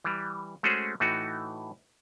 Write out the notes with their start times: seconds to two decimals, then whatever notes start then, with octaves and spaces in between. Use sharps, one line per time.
0.04 E3 G3
0.63 G#3 A3 C#4 F#4 G#4 C5
1.00 A2 E3 A3 D#4 F#4